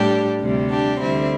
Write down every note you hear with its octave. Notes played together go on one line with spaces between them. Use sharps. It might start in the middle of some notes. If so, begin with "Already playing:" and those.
Already playing: A2 G3 D4 G4
D2 C3 G3
D4 G4
D2 D3 G3 C4 E4